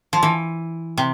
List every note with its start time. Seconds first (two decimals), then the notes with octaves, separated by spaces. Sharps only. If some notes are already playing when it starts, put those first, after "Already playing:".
0.13 F3
0.23 E3
0.98 C3